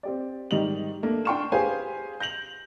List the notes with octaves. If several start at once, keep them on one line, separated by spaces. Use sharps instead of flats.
C4 G4 D5
G#2 D#3 G3 D#5 F7 F#7
A3 A#3 D4
D4 G5 C6 C#6 F6 E7
G4 G#4 B4 C5 F5 G#5
G6 A#6 F7 F#7